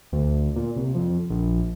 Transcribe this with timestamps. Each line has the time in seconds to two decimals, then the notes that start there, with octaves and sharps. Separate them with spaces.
0.12 D2
0.56 A#2
0.76 C2
0.95 F2
1.30 A#1